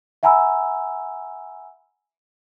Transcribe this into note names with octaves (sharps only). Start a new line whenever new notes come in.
E5 F#5 G#5 A#5 B5 E6